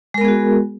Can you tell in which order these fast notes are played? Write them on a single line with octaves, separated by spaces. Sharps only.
G#3 A#4 B3 G#4 F#4